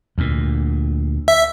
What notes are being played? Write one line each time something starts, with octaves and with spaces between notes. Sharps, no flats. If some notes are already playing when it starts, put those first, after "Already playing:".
D2 A#2
E5